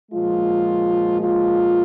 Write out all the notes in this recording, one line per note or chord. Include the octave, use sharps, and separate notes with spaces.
A#2 F3 G#3 F4
F4